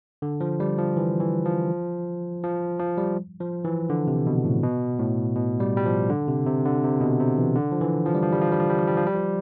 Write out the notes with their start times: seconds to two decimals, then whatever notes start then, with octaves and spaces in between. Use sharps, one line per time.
0.22 D3
0.41 F3
0.60 G3
0.78 F3
0.97 E3
1.20 E3
1.45 F3
2.43 F3
2.79 F3
2.98 G3
3.40 F3
3.64 E3
3.90 D3
4.07 C3
4.26 B2
4.44 A2
4.63 B2
4.99 A2
5.36 B2
5.60 G3
5.77 G3
5.85 F3
6.10 D3
6.28 C3
6.46 C3
6.65 D3
6.83 C3
7.01 B2
7.20 C3
7.38 E3
7.56 D3
7.72 F3
7.81 E3
8.06 F3
8.15 G3
8.23 F3
8.32 G3
8.41 F3
8.52 G3
8.60 F3
8.70 G3
8.79 F3
8.88 G3
8.97 F3
9.07 G3
9.15 F3